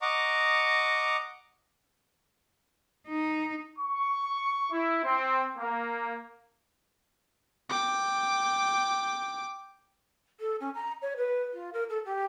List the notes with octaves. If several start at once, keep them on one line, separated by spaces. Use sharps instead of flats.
D#5 F#5 A#5 C#6 D6
D#4
C#6
E4
C4
A#3
G5 D6
A4
C#4
A#5
C#5
B4
F4
A#4
A4
G4